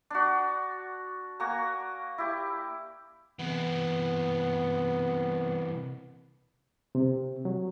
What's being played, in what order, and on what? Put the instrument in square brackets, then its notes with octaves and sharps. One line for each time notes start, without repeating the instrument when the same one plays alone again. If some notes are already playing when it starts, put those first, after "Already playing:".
[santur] D4 F#4
A#3 F#4 G#5 A#5
E4 G4
[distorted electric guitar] C3 E3 [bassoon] B3
[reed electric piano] C3
F#3